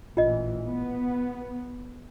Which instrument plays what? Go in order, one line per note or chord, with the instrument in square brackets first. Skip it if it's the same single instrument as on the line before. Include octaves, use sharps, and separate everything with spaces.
[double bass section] A1 A#2 E3 [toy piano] F4 D#5
[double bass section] B3